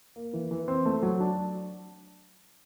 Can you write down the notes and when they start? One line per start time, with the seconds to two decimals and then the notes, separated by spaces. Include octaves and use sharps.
0.16 A#3
0.34 E3
0.51 E3
0.68 C4
0.86 A3
1.02 F#3
1.20 D4